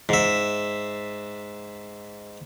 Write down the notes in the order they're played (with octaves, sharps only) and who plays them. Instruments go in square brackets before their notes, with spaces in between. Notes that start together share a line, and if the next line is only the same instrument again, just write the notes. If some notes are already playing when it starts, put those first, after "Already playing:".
[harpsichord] G#2 E5